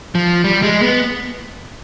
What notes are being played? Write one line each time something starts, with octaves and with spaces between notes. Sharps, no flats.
F3
G3
G#3
B3